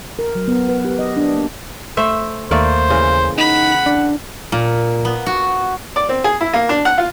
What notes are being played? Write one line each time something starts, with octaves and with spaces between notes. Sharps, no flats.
A#4
F#3
B3
B4
G4
D#5
D4
A#3
A3 C5 E5
D#2 A3 A#3 C5 D5
C#3 E3
D#4 F#5 B5
D4
A#2
B3
F#4
D5
C4
G#4
E4
A#3
D4
F#5
F4